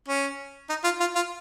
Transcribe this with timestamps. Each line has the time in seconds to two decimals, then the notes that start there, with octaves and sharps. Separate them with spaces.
0.08 C#4
0.69 D#4
0.84 F4
1.00 F4
1.15 F4